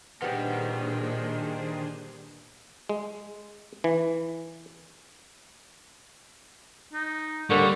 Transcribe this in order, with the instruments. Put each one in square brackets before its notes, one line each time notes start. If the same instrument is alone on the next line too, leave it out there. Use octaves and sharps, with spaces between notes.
[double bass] A#2 [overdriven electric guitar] D#3 [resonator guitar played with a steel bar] G3 B3 [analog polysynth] D4 G#4 C5
[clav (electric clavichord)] G#3
E3
[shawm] D#4
[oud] D#2 A#3 [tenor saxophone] D3 [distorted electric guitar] G3 [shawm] C#6